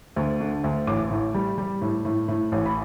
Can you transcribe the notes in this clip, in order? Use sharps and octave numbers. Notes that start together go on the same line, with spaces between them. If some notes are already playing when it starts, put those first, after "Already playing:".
D2
D3
D2
A1 D6
A2
G3
G3
A2
A2
A2
A1
B5